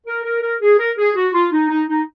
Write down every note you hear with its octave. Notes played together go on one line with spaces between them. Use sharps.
A#4
A#4
A#4
G#4
A#4
G#4
F#4
F4
D#4
D#4
D#4